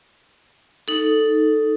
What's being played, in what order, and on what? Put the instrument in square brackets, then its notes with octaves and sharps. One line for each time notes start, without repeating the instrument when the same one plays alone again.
[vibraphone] D#4 A4